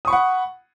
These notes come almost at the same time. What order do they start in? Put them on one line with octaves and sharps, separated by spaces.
D#6 C#6 B5 F#5